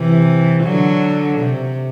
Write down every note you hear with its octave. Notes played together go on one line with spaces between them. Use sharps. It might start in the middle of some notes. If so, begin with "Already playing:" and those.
Already playing: C3 E3
D3 F#3
C3